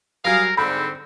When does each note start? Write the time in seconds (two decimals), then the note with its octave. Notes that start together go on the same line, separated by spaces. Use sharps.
0.25 F#3 G3 G#4 A#4 F5
0.57 G#2 D3 C4 B5